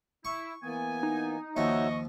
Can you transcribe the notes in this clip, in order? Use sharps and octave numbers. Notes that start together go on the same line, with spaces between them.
E4 C#6
E3 A#3 B3 G#5
D#4
D#2 F3 F#4 C#5 D#5 E5 C#6